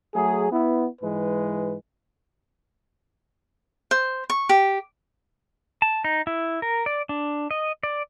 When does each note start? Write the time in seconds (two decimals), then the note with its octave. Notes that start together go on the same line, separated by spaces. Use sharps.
0.14 F#3 A3 G#4
0.51 B3 E4
1.02 G#2 E3 G#3 B4
3.91 C5
4.30 C#6
4.49 G4
5.82 A5
6.04 D#4
6.27 E4
6.62 A#4
6.86 D5
7.09 D4
7.51 D#5
7.83 D5